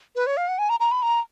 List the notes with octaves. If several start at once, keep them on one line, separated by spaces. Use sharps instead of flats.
B4
C#5
F5
F#5
G#5
A#5
A#5
B5
A#5